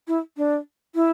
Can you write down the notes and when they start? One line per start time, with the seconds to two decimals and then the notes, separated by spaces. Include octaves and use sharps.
0.08 E4
0.37 D4
0.95 E4